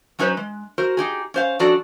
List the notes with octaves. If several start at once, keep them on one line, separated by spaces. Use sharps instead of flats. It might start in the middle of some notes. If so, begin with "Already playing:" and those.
F#3 C#4 D#4 B4 C5
G#3
F#4 A#4 C5
D#4 G4 G#4
C#4 C5 F5
F3 C#4 D4 F#4 A4 D5